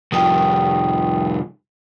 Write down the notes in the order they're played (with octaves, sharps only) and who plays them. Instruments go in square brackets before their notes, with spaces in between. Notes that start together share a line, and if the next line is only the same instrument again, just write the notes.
[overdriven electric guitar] C2 F2 [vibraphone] G5 D#6